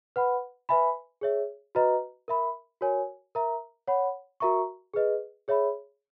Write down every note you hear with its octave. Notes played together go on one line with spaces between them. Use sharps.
B4 F#5 B5
B4 E5 G#5 B5
G#4 C#5 E5
F#4 B4 D#5 A#5
A#4 E5 B5
F#4 A#4 C#5 G#5
A#4 E5 A#5
C#5 F#5 B5
F#4 A#4 E5 A#5 C#6
G#4 B4 D#5
G#4 C#5 E5 B5